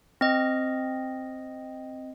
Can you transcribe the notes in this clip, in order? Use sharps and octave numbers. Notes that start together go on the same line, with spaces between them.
C4 D#5